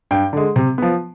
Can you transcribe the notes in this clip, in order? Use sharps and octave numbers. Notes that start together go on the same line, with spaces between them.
G2 G5
D3 G#3
C3
F3 B3